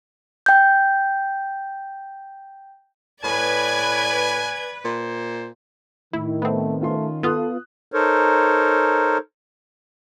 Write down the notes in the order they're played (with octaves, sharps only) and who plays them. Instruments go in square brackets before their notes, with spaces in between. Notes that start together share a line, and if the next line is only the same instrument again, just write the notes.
[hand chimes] G5 G6
[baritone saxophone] A2 [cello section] B4 [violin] D5 G#6 [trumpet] G#5
[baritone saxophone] A#2 [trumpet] C5
[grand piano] A2 [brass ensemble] D#3 [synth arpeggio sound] E4
[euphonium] A3 [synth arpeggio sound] B3 C4
[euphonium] A3 [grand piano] C#4 F4 C6
[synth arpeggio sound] B3 F4 [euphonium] A4 [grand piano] D#6 F#6
[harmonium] D#4 A4 A#4 C5 C#5